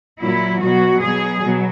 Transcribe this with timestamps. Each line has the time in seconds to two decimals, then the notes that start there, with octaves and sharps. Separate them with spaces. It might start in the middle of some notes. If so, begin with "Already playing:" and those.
0.20 A#2 F#3 E4
0.61 B2 F#3 F#4
1.01 B2 F#3 G#4
1.42 B2 F#3